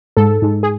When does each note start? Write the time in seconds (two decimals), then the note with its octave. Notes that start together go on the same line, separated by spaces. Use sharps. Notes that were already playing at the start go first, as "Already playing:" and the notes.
0.17 G#2 A4
0.42 G#2
0.63 G#4